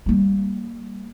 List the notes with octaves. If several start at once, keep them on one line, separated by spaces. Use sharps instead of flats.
G3 A#3